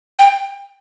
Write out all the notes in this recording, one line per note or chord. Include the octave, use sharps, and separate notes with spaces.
G5